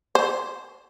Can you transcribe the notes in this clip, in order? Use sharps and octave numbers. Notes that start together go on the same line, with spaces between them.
C5